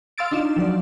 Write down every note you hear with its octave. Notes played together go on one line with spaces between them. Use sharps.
F5 C6 E6 A6 D7
D4 D#4 F4 E7
F3 F#3 D5